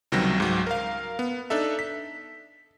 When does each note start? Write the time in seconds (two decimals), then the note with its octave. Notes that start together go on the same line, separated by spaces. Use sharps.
0.12 C#2 C3 D#3 F#3 G3 A#6
0.38 C#2 G#2 F#3
0.67 A#4 F5
1.19 B3
1.50 D4 D#4 A4 E5
1.79 B6